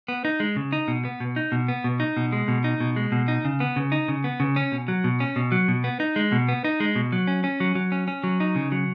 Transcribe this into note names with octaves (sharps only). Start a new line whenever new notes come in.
B3
D#4
G#3
C#3
D#4
B2
B3
B2
D#4
B2
B3
B2
D#4
B2
G#3
B2
D#4
B2
G#3
B2
D#4
C#3
B3
C#3
D#4
C#3
B3
C#3
C#4
B2
F#3
B2
C#4
B2
F#3
B2
B3
D#4
G#3
B2
B3
D#4
G#3
B2
F#3
C#4
C#4
F#3
F#3
C#4
C#4
F#3
D#4
C#3
F#3